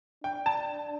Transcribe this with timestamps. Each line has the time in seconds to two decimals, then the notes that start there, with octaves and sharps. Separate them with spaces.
0.23 D4 G5
0.46 A5